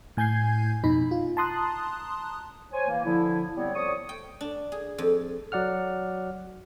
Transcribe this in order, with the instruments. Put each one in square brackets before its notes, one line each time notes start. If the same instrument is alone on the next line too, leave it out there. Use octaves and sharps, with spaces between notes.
[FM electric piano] A2 G#5 G6 G#6 C7
F2 B2 D#4 B5
F4
A5 A#5 C6 D#6 F#6
[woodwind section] C5 C#5 G#5
E3 A#3
D3 F3 E4
G3 B3 C4 C#5
F2 C#5 D5 C#6 D#6
[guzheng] G5
D4
G#4
F2
[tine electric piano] F#3 D5 F#5 F6